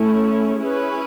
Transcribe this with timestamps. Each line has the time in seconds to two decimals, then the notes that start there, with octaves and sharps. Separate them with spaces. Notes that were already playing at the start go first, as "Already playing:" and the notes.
Already playing: A3 C#4 E4
0.61 C#4 E4 G#4 B4